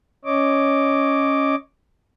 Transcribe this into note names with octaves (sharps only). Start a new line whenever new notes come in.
C#4 C#5 D#5 D6